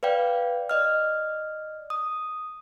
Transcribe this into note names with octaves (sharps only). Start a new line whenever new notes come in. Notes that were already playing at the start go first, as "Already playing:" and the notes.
B4 D5 F5 G5
D5 D#5 F6
D#6